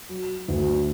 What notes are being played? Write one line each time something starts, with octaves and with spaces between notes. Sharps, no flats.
F#3
D2